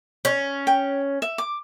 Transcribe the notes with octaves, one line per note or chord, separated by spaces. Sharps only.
C#4
G5
E5
D6